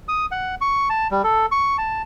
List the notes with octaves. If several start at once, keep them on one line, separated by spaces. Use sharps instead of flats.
D#6
F#5
C#6
A5
G3
A4
C#6
A5